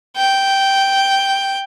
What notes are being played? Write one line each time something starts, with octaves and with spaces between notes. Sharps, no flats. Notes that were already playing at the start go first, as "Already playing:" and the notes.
G5